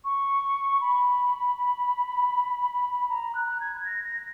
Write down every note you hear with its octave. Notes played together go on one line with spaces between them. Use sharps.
C#6
B5
A#5
F#6
G#6
G#6
A#6
A#6